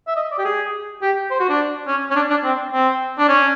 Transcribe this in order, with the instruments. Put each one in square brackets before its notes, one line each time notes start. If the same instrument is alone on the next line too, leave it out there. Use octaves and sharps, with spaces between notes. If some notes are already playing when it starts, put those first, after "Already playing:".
[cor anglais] E5
D#5
D5
G4
G#4
G4
C5
F#4
D4
C#4
C#4
D4
D4
C4
C4
D4
C#4